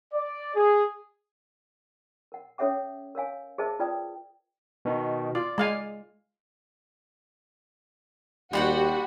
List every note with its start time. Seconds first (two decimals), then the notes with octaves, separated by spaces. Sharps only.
0.14 D5
0.55 G#4
2.32 A#4 F#5
2.58 C#4 A4 C#5 E5 F#5 D6
3.15 A#4 C#5 F5 G#5
3.58 G#4 A#4 C5 D#5 E5 A5
3.79 F4 B4 D5 G5 D#6
4.85 B2 D#3
5.35 F4 D5
5.58 G#3 F5 G#5
8.53 D#2 G3 F4 F#4 F#5 G5